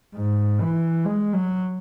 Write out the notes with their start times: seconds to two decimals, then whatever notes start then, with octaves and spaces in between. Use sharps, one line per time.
0.16 G#2
0.60 E3
1.05 G#3
1.34 F#3